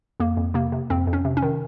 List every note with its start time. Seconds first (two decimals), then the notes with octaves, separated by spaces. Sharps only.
0.20 F2 A#3
0.37 F2
0.54 C3 A#3
0.72 C3
0.90 F2 C4
1.07 F2
1.13 C#4
1.25 C3
1.37 C#4
1.42 D#3